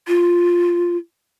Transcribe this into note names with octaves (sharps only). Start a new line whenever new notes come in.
F4